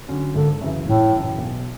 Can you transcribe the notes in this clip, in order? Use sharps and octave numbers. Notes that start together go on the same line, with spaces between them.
D3 F#3 C#4
G#1 D3
F#2 C#3 E3
G#1 A2
F#2 C#3 E3
B1